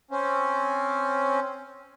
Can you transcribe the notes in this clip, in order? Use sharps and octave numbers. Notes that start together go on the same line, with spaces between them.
C4 C#4